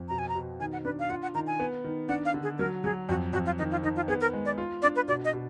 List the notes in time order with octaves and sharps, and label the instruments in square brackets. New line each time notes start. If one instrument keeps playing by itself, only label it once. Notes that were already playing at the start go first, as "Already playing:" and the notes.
Already playing: [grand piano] F2
[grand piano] B2 [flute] A#5
[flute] G#5
A#5
[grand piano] B2
[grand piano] D#3 [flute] G#5
[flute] F#5
[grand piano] D4 [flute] B4
[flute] F5
[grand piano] F4 [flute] F#5
[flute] F#5
[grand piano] D#3 [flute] A#5
[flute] G#5
[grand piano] B3
D#3
[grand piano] D4 [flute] F#5
[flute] F5
[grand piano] D3
[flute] G#4
[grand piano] F#3 [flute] A#4
[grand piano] F#3 [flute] G#4
[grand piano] F2 [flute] F#4
[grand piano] F2 [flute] F#4
[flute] F4
[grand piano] D#3 [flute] D#4
[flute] F4
[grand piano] D#3 [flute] D#4
[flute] F4
[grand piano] B3 [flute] G#4
[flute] A#4
[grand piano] G#3
[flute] D5
[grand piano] F4
[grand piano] D4 [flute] D5
[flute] B4
[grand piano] B2 [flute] D5
[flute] D#5
[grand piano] B2